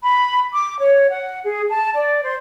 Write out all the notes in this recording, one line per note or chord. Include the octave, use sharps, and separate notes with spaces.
B5
D6
C#5
F#5
G#4
A5
D5
C5